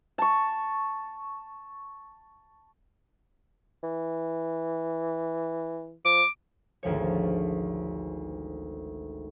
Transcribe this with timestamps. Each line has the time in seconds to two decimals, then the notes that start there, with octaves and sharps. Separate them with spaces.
0.18 A5 C#6
3.83 E3
6.05 F3 D6
6.83 G#1 D2 F3 C#5